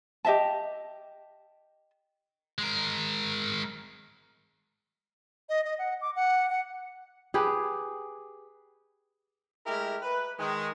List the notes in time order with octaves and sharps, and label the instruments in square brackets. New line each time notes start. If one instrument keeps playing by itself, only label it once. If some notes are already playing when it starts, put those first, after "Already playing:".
[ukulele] G4 D#5 E5 A5
[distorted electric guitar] G#3 A#4
[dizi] D#5
D#5
F#5
D6
F#5
F#5
[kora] G4 G#4 B4
[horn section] G#3 A3 E4 G4 A#4
B4
D#3 G#3